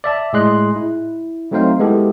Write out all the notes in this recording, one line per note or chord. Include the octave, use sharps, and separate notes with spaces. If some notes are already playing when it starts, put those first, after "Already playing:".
D5 E5 A5
A2 G#3 G#4 D#5 C6 F#6
E4
F#3 A3 C4 D#4 C5 F5
G#3 B3 E4 G4 A4